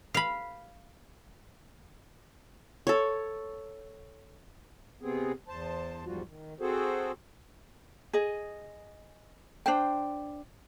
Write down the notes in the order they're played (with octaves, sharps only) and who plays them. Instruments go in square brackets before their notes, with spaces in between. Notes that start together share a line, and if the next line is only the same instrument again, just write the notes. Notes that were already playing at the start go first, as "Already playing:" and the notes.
[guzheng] F5 B5
[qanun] A4 C#5
[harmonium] C3 B3 C4 G#4
E2 C5 A5
E2 G#2 F3 G3 F4 F#4
D#3
C4 F#4 G#4 A4 C5
[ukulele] G#4 D#5
D4 C5 G5